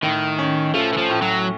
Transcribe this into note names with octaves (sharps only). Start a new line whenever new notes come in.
A2 D#3
C#4
F3 A3
E3
F3
A2
F#3